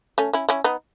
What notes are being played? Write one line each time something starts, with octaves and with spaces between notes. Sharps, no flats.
A3 C#4
C#4 E4
C#4 E4
B3 D#4